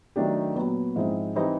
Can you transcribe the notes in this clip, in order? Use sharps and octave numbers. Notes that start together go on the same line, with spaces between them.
D#3 F#3 A3 D4 G4
A#2 F#3 B3
G#2 F3 G#3 C4 E4
E3 G3 C4 D#4